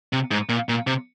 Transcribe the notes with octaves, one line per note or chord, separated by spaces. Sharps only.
C3
G#2
A#2
A#2
C3